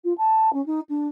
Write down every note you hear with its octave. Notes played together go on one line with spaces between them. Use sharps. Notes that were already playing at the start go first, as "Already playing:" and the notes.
F4
A5
C#4
D#4
D4